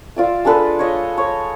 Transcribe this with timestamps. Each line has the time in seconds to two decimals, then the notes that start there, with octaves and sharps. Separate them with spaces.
0.16 F4 D5 E5
0.45 G#3 D4 A4 B4
0.79 C#5 D#5
1.18 C#5